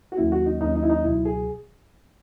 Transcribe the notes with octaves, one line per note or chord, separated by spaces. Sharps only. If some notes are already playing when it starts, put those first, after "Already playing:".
F#4
D#2 D#3 F#3 A#3 C#4 E4
F#4
D#4
D#2 D#3 F#3 A#3 C#4 D#4
D#4
E4
D#4
C#2 B2 F#3 E4
G#4